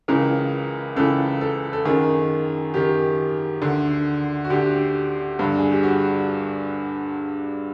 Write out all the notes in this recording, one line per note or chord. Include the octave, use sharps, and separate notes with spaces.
C#2 C#3 E3 A#4
C#2 C#3 E3 A4
A4
A4
F#2 D#3 G#4
F#2 D#3 G4
D2 D3
F#4
D2 D3 G4
G2 D3
G#4
G4
F#4